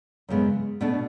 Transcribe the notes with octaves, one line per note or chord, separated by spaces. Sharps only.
F#2 C#3 G#3 B3
B2 A3 D4